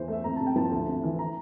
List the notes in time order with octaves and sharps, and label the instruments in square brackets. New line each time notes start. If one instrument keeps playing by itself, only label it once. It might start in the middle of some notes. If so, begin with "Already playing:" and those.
Already playing: [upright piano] E2 E3 C5
A3 E5
F2 A#5
C3 A5
G5
F3 A5
D2
C3
E3
A#5